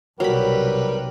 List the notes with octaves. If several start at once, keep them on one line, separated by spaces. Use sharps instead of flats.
B1 C3 F#3 G3 G4 A#4 B4 B5